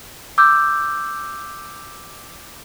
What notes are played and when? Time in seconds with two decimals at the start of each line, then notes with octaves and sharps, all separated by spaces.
0.38 D6 E6 G6